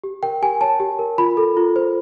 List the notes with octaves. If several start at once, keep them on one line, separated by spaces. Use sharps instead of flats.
G4
A#4 G5
G4 G#5
C#5 A5
G4
A#4
F4 B5
A4
F4
C5